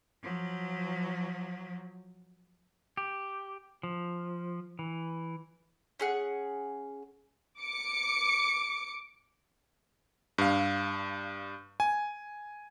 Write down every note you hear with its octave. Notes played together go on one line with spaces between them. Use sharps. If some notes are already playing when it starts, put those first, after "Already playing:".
F3 F#3
G4
F3
E3
C#4 G#4 F#5
D6 C#7
G2 F5
G#5